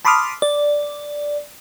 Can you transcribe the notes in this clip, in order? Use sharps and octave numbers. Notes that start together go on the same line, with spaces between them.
A5 B5 C6 D6 D#6 F6
D5